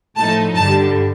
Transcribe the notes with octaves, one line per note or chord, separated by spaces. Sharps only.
A2 F3 A3 D#4 A5
G2 D3 G3 A5